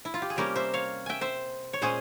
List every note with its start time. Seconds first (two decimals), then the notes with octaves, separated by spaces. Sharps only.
0.05 E4
0.14 F4
0.22 G4
0.30 G#4
0.36 C3 G3 A#3 C#4 G4 A#4
0.56 C5 E5
0.74 C#5 F5
1.06 E5 G5 G#5
1.21 C5 E5
1.73 C#5
1.82 A#2 G#3 C#4 G#4 C5